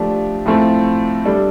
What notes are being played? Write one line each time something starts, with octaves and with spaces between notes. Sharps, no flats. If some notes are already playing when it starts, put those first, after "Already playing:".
Already playing: F3 A3 D4 G4
A2 F3 A3 C4
G3 D4 A4